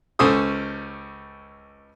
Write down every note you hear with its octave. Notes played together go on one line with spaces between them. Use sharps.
C#2 C#4 A4 C5 D#6